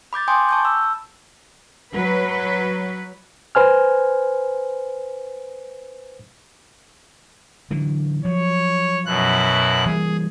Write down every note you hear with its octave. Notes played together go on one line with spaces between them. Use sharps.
B5 D6 G6 A6
G5 G#5 C6 D6 D#6 G6
A5 C#6 G6
B5 E6
F#3 B4
B4 C5 G#5 F6
D3 E3 F#3
F3 F#3 C#5
F#2 B2 E4 F#6
E3 G3 A#3 G#4